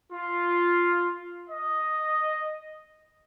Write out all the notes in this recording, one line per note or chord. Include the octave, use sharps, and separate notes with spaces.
F4
D#5